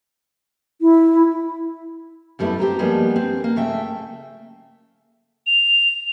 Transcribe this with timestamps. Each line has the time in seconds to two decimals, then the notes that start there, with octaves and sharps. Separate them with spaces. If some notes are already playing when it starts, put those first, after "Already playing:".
0.81 E4
2.39 F#2 G3 A3 B3 E4
2.59 C4 G4 C5 A#5
2.79 F3 G3 G#3 A#3 B3 D4
3.16 C4
3.44 A#3
3.56 C#3 A3 E5 G5
5.47 F7